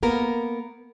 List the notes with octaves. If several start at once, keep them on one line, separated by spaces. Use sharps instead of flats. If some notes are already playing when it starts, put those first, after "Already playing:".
A#3 B3 A#4